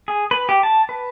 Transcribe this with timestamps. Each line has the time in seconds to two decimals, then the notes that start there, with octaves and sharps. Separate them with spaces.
0.08 G#4
0.31 B4
0.49 G4
0.63 A5
0.89 B4